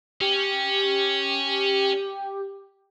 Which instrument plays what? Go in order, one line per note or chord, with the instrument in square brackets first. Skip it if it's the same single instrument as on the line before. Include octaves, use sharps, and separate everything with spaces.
[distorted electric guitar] C#4 [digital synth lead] G4